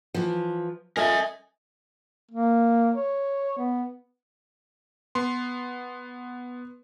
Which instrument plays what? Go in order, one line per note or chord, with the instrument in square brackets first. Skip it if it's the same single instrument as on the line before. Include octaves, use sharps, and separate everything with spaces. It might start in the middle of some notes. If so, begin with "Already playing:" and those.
[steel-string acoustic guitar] E3 F3
[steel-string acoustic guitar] F4 A4 [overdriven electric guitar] A#4 E5 [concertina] D#5 G#5
[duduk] A#3
C#5
B3
[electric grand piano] B3 C6